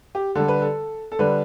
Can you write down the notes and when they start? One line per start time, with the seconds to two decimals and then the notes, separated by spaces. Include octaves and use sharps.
0.15 G4
0.35 D3 G3 A4
0.48 B4
0.62 A4
1.12 A4
1.19 D3 G3 B4